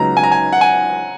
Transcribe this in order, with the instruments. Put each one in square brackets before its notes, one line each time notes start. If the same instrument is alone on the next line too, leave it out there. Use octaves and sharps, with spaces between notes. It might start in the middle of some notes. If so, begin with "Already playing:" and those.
Already playing: [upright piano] C#2 C#3 F#3 B3 D#4 [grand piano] A#5
[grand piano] G#5
A#5
G#5
F#5
G#5